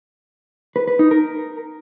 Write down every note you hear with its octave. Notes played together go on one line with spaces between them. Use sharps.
B4
B4
D#4
A#4